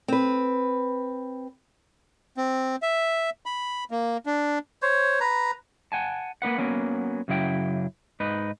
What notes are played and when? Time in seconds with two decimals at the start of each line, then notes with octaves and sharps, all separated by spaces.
0.08 C4 B4
2.37 C4
2.82 E5
3.46 B5
3.91 A#3
4.26 D4
4.82 C5 C#5
5.21 B4 A#5
5.92 F#5 G#5 A5
6.42 A#3 C#4 B4 F#5
6.58 F#3 A#3 B3 C#4
7.28 F#2 C#3 F#3 E4 G5
8.20 G#2 D#4 B4